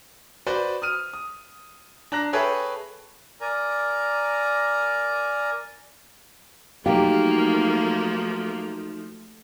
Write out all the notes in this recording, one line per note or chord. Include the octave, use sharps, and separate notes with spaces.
F#4 B4 C5 D5
D#6 F6 D#7
D#6
D4 A#5 F#6 A#6
G#4 A4 B4 C#5 E5 G5
A#4 D5 G#5 A#5
F3 F#3 A3 A#3 D#4 G4 F5